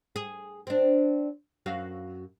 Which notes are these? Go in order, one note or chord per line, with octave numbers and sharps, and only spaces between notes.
G#4
C4 D4
F#2 F#4 F5